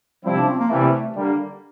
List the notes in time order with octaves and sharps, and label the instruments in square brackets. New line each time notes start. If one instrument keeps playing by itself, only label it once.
[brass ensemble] C3 F3 C4 E4 [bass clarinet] G3
[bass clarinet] D4
C4
A#3
[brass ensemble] C3 E3 G3 [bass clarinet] A3
[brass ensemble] D3 G3 A#3